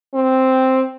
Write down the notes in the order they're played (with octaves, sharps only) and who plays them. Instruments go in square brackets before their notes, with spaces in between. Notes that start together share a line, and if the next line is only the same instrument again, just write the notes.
[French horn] C4